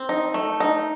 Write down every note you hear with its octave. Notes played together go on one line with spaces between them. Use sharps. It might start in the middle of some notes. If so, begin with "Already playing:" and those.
Already playing: C4
D#4
A3
D#4